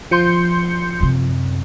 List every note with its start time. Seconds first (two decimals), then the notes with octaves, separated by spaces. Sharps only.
0.11 F3 C6 G6 C#7
1.00 F#2 C3